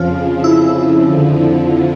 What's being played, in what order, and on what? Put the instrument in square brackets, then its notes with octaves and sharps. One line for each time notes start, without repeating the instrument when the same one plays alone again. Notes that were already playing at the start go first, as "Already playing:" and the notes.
Already playing: [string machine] F2 C#3 F3 [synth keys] F4
[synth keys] E4
[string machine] F2 D3 F3